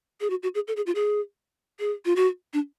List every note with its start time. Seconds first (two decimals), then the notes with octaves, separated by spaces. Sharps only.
0.21 G#4
0.30 F#4
0.43 F#4
0.55 G#4
0.68 A4
0.76 G#4
0.86 F4
0.95 G#4
1.80 G#4
2.05 F4
2.16 F#4
2.53 D4